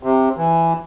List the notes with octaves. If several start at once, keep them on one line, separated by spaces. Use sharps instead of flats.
C3
E3